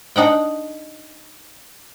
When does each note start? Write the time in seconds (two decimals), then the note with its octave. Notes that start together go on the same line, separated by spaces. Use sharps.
0.16 D4 D#4 F#5 G5